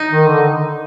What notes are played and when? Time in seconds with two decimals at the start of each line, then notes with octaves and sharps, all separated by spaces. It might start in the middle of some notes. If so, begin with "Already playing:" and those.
Already playing: D#4
0.10 D#3
0.28 D3